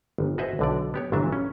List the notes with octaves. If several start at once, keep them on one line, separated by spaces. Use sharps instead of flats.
G1
F#4 G#4 B4 C5 D#5 E5
B1 D3 D5
B3 G4 C#5
G1 A#2 E3 F#3 D4 E5
C#4